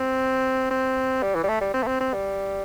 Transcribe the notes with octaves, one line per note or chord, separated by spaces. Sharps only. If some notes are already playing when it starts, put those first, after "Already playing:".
Already playing: C4
C4
G3
E3
G3
A3
G3
C4
A3
C4
C4
G3